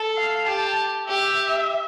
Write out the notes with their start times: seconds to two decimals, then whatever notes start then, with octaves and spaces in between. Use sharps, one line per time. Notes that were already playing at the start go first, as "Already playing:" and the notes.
Already playing: A4
0.17 F5
0.47 G4 A5
1.08 G4 E5